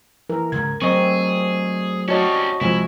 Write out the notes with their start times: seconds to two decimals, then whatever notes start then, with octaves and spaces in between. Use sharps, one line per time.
0.30 E3 A#4
0.52 C#2 G#2 C#3 G#6
0.82 F#3 A3 C4 G#4 D#5 C#6
2.09 G3 C#4 F#4 C#5 D#5 A5
2.61 C2 F3 G#3 E4 G#5